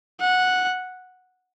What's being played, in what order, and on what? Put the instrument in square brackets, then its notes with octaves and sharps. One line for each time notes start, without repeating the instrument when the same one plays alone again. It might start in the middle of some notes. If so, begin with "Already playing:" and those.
[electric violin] F#5